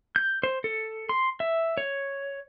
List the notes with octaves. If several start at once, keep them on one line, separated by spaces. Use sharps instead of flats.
G6
C5
A4
C6
E5
C#5